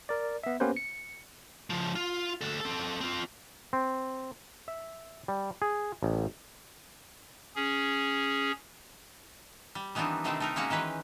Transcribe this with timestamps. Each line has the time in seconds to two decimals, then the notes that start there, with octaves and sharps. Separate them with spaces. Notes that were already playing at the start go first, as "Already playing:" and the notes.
0.09 A#4 D5
0.43 B3 E5
0.60 A#3 B3 C#4 G4 B4 C5
0.77 C#7
1.70 C#3 F3
1.95 F4
2.41 D2 A4
2.61 C4 A4
3.01 C4 F4
3.73 C4
4.68 E5
5.28 G3
5.62 G#4
6.03 A1
7.56 C#4 G#4
9.75 G3
9.95 D#3 E3 B3 C4 D4 D#4
10.24 C3 D#3 G3 A3 C4 D4
10.40 A3 D#4 A#4
10.56 G#3 A#3 C#4 F#4
10.70 D#3 E3 G#3 B4 G5